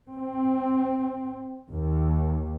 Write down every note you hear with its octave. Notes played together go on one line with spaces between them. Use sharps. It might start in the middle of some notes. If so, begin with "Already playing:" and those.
C4
D#2